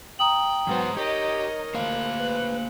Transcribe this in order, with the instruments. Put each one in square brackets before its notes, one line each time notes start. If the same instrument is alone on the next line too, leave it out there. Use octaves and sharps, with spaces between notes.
[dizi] G5 [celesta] A#5 D#6 F#7
[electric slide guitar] E2 G#2 C5 [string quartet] F#3 B3
[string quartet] D#4 C#5 D#5 [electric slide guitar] G4 [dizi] A#4
[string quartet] D2 F#6 [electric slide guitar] A#3 C5 F5
[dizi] B4